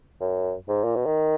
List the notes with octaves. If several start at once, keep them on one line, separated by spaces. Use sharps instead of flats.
F#2
G#2
A#2
B2
D#3